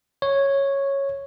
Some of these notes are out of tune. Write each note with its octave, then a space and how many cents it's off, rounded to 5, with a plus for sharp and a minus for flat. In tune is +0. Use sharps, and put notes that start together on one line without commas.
C#5 -5